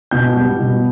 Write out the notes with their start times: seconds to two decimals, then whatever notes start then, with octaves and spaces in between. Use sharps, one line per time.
0.11 B2 G6
0.36 G3 B3
0.59 B2